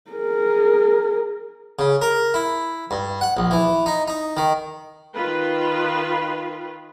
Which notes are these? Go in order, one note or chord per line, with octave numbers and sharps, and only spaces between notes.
G#4 A#4
C#3
A#4
E4
G2
F#5
A#1
E3
D#4
D#4
D#3
D#3 F4 B4